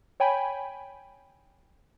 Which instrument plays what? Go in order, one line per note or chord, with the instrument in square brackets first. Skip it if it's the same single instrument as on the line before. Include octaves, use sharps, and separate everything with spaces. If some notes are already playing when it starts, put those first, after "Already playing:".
[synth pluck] C#5 G5 G#5 B5